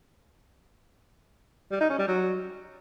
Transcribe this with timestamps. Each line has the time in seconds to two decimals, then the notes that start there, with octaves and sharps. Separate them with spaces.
1.71 G3
1.80 D#4
1.89 C#4
1.98 G3
2.07 F#3